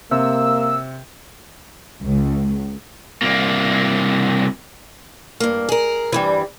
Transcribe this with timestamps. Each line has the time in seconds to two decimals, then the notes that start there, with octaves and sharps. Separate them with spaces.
0.11 C3 A#3 E6
2.04 C#2
3.22 C2 A#3
5.40 G2 A#3
5.69 G#4 A#4
6.12 D2 G2 E3 G3